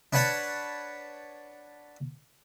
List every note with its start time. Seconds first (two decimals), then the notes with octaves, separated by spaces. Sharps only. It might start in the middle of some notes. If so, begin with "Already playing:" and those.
0.13 D4 B4 C#5 F#5 A5 B5